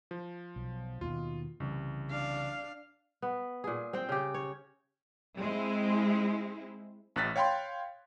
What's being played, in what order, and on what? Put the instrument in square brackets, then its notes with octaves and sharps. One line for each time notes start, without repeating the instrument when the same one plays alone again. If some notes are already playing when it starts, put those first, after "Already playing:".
[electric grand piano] F3
[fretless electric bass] B1
[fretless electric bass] D#2 B2 D#3 [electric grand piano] F4
[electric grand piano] C2 [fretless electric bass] C#3 E3
[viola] D4 F5
[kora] B3
A#2 G#4
C4 C5 G5
C#3 G4
C#5
[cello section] G#3 C4 E4
[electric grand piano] A1 A2 F#6 A6 B6
C#5 F5 G5 B5 C6